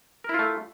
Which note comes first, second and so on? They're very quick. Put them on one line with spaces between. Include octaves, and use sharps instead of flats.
A#4 E4 F4 A3